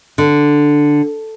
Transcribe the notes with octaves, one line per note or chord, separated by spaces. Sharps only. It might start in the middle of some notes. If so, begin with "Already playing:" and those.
D3